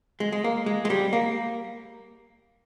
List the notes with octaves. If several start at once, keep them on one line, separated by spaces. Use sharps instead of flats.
G#3
G#3
A#3
G#3
G#3
G3
A#3